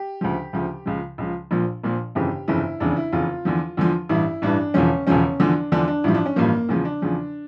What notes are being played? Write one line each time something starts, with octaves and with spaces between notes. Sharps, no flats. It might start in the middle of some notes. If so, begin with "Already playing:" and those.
Already playing: G4
D2 C#3 F3
D2 C#3 F3
C#2 C#3 F3
C#2 C#3 F3
A#1 A#2 F3
A#1 A#2 F3
G1 F2 C#3 E3 G4
G1 F2 C#3 E3 E4
F1 E2 C#3 D4
E4
F1 E2 C#3 F4
E2 D3 F3
E2 D3 F3
A1 G2 E3 E4
A1 G2 E3 D4
E1 E2 C#3 F3 C#4
E1 E2 C#3 F3 C#4
E2 D3 F3 D4
E2 D3 F3 D4
D4
A1 G2 F3 E4
D4
C#4
A1 G2 F3 A#3
E2 C#3 F3
D4
E2 C#3 F3